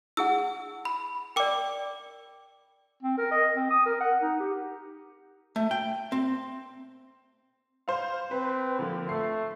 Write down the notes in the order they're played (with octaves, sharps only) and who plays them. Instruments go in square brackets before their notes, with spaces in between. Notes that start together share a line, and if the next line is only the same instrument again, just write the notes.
[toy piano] E4 G#4 F#5 [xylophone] E6
[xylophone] B5
[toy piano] A#4 D5 [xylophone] G5 D6
[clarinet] C4
A#4
D#5
C4
D#6
A#4
F#5
D#4
G4
[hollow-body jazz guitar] A3
G5
C4
[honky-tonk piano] C5 F5
[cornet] C4 [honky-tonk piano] B4
[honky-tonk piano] D3 F3 A#3
[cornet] A3 [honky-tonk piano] C7